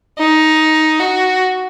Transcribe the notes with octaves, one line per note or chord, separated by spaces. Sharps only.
D#4
F#4